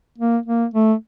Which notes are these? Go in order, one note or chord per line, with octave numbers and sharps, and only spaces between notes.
A#3
A#3
A3